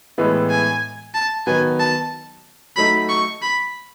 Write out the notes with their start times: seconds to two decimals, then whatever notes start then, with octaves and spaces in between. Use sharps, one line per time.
0.18 A2 E3 G#3 B3 E4
0.50 G#5
1.14 A5
1.47 D#3 F#3 B3 G#5
1.80 A5
2.76 F#3 A3 D#4 B5
3.09 C#6
3.42 B5